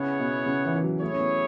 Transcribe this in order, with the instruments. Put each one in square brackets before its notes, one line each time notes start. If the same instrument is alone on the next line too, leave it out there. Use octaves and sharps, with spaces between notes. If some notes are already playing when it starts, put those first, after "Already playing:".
Already playing: [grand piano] C#3 [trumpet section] B3 E4 G#4 C#5 F#5
[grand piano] B2
C#3
E3
E3
F#3
[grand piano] A3 [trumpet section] E4 G#4 C#5
[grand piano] C#4
B3